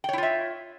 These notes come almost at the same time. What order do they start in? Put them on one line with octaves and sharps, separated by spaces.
G5 C#5 E4 F4 E5